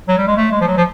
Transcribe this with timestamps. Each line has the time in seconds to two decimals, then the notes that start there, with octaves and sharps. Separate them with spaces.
0.08 F#3
0.18 G3
0.27 G#3
0.37 A3
0.52 G#3
0.61 F3
0.67 F#3
0.77 F3